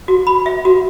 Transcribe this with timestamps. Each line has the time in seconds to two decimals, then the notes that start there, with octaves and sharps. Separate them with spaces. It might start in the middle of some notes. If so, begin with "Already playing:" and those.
0.08 F#4
0.27 B5
0.46 E5
0.65 F#4